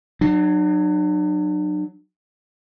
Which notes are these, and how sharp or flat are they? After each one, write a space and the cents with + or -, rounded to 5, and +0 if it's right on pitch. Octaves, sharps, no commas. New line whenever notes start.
F#3 +0 D4 +45